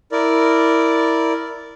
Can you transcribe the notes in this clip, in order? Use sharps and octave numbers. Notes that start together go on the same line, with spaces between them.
E4 A#4 D5